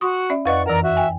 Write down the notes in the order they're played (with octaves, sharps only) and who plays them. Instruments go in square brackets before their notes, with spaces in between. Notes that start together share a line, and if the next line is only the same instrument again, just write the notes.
[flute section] F#4 [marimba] C6 C#6 D#6
[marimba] C#4 D5 E5
[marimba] F2 B4 D#5 [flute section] D5 F#5 C#6
[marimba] F#2 E3 [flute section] A#4 D5 A#5
[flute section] F#4 E5
[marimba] G5 G#5